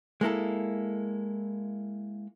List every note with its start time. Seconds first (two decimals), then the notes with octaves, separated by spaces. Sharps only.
0.21 G#3 A#3 E4 A4